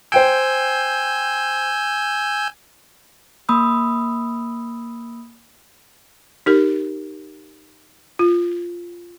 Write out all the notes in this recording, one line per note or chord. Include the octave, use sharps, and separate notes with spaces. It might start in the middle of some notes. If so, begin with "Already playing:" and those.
C5 G5 G#5 E6 G6 D7
A#3 B5 D#6 E6
D#4 G4 A#4
F4